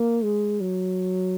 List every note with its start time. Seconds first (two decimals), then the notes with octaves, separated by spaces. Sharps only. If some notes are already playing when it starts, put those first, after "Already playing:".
Already playing: A#3
0.24 G#3
0.61 F#3